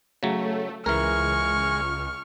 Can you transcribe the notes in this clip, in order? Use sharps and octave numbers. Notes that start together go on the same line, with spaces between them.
C#3 F#3 A3
C#2 E3 G#3 A#4 C#6 F6